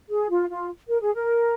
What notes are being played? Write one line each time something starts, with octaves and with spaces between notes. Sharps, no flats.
G#4
F4
F4
A#4
G#4
A#4